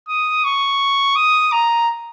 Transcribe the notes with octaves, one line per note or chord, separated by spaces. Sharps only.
D#6
C#6
D#6
A#5